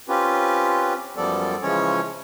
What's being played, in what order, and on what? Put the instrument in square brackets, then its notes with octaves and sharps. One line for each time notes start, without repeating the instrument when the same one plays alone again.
[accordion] C4 C#4 F4 G4 B4
F#2 F3 G3 B3 A4 D5
C#3 E3 F3 G#3 C#4 C#5